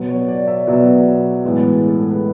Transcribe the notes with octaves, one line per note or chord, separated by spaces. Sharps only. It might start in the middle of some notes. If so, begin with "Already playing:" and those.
Already playing: B2 F#3 B3
C#5
D5
E5
B2 F#3 B3 D5
A2 E3 G#3 B3
G#4
A4
B4